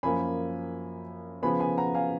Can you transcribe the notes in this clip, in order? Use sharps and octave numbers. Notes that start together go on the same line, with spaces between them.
F#2 F3 A#3 G#5 B5
C#3 F3 B3 G#5 B5
G#5 B5
F#5 A#5
F5 G#5